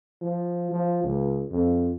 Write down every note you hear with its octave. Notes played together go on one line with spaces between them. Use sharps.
F3
F3
C#2
F2